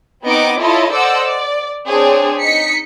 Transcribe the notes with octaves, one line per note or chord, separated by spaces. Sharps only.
B3 C4 D#4 D#5 D6 D7
E4 F4 A4 C#5 D#5 A5
A4 C5 D5 D#5 F#5 E6
D5
C4 D4 G#4 C#5
D#4 D#5 B6 C#7